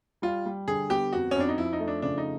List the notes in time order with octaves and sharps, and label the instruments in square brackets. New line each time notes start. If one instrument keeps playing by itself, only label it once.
[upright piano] G3 [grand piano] F4
[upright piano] G3
[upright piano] D3 [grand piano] G#4
[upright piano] B3 [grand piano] G4
[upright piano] F2 [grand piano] F#4
[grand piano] C#4
[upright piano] F2 [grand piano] D4
[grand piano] D#4
[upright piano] F3 [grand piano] E4
[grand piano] D#4
[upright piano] A3
[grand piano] D4
[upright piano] C#3 [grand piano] D4
[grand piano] D#4